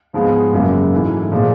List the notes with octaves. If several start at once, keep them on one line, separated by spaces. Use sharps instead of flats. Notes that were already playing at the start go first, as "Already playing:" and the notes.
G#2 F3 G#3 B3
F#2 C#3 F#3 A#3
G#2 E3 A3
A#2 F3 G#3